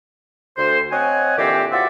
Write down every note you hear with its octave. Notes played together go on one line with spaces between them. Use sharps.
D2 C5
C4 C#5 D#5 F#5 G#5
A#2 D3 E3 C4 G4
F4 F#4 C5 D5 E5 F#5